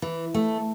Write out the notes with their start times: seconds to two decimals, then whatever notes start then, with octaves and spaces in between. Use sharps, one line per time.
0.02 E3
0.34 A3